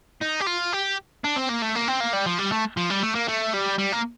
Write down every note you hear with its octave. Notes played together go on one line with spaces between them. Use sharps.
D#4
G4
F4
G4
D4
C4
A#3
A3
A#3
C4
A#3
G3
F3
G3
A3
F3
G3
A3
A#3
A3
G3
G3
A#3